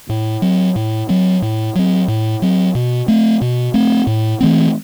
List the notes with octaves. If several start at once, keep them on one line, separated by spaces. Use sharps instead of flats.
A2
F#3 C4
A2
F#3 C4
A2
F#3 C4
A2
F#3 C4
B2
A3 C4
B2
A3 C4
A2
E3 A3 C4